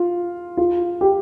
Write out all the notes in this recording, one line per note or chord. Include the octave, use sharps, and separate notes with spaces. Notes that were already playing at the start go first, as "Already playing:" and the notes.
Already playing: F4
F4
G4